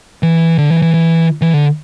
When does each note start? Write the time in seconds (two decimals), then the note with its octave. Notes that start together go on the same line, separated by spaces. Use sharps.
0.23 E3
0.58 D3
0.70 E3
0.82 E3
0.94 E3
1.42 E3
1.53 D3